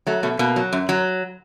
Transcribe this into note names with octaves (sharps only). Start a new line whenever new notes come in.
F#3 A3
B2 A3
B2 A#3
F#3
F#2
F#3